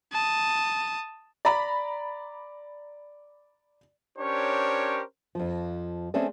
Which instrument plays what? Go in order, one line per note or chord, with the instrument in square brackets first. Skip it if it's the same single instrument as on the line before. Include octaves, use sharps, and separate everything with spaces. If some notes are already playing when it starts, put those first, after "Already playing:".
[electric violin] A5 D#6
[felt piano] D5 A#5 B5
[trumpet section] C#4 D4 G4 A#4 C5 C#5
[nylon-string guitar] F2 F3
A3 C4 C#4 G#4 A4 D5